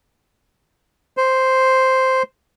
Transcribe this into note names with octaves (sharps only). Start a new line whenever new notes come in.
C5